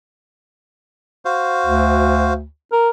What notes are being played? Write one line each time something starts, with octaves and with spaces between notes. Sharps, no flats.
F#4 C5 F5
D2
A#4